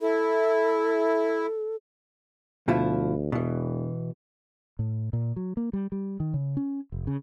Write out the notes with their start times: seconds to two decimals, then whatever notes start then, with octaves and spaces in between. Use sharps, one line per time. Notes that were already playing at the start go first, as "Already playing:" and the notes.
0.01 E4 A4
2.68 D2 B2 F3 E4
3.32 E1 B2 E3
4.79 A2
5.13 A#2
5.36 F#3
5.57 A#3
5.73 G3
5.92 G3
6.20 D#3
6.34 C#3
6.57 C#4
6.92 F1
7.07 C#3